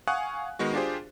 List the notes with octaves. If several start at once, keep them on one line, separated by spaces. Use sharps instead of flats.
F5 F#5 G#5 C#6 D#6 F#6
D#3 G#3 B3 F#4
D4 F4 G4 G#4 C5